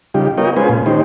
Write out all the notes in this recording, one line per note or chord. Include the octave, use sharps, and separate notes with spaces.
C#3 G3 D#4 F4 G4
B3 F4 A#4 C#5 D#5 G5
G#3 C#4 F4 B4 C5 G#5
A#2 F4
D#3 C#4 D#4 G4 C5